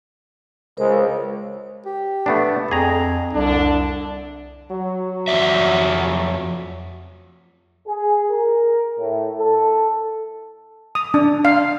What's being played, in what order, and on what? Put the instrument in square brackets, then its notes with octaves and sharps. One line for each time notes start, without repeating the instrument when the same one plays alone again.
[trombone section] C#2 [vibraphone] A#4 C5
[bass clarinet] G4
[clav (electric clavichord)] A3 B3 D4
[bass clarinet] F2 [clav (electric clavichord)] G#4 A#5
[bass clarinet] C2 [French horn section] D3 D4
[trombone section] F#3
[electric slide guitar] F2 D5 E5
[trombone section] G#4
A#4
A2
A4
[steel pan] D#6
D4
F5